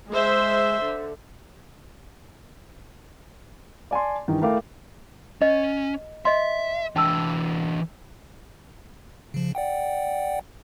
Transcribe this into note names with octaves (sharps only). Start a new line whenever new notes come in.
G#3 C5 E5
D3
D5 G#5 A5 C6
G2 D#3 E3
A3 E4 A#4 F5 G5 D6
C#4 D#5
D#5 E5 C6
E3 D4 G5 A5 E6
C#3 F3
D5 F#5 G5